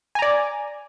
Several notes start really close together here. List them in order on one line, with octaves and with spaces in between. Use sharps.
G#5 A#5 D5